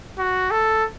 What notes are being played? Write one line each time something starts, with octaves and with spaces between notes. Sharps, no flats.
F#4
A4